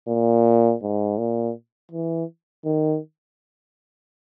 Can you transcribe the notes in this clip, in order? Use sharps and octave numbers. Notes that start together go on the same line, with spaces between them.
A#2
G#2
A#2
E3
D#3